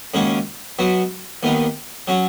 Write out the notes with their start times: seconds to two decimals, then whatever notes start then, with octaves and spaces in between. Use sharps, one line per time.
0.14 D#2 C#3 G#3 C#4 F#4
0.79 B2 F#3 B3 F#4
1.43 D#2 D#3 B3 D#4
2.08 F#3 C#4 F#4